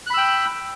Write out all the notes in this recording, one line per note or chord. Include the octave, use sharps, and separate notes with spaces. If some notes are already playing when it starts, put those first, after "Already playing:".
G5 B5 E6 F#6